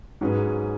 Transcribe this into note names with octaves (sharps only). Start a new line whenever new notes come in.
G#2 F#3 C#4 G#4 B4